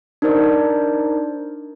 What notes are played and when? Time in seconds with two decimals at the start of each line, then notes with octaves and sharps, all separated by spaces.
0.22 D4 D#4 A#4 C5 D5